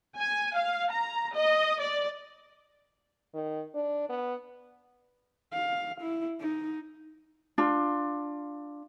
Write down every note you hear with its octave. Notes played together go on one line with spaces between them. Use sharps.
G#5
F5
A#5
D#5
D5
D#3
D4
B3
F5
E4
D#4
D4 F4